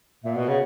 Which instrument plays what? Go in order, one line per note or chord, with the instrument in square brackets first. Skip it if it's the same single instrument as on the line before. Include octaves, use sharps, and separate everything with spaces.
[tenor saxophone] A#2 [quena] E5
[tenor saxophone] B2 [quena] F#5
[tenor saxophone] C#3 [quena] F#5